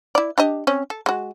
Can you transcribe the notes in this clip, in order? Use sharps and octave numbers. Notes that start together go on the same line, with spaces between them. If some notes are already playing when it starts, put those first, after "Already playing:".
E4 D5
D4 G4 D#5
C4 C#4 C#5
A4
G#3 F#4